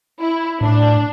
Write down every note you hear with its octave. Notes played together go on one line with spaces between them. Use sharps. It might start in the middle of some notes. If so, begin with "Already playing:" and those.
E4
A2 D4